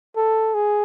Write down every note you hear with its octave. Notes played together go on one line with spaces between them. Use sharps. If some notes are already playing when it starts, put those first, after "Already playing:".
A4
G#4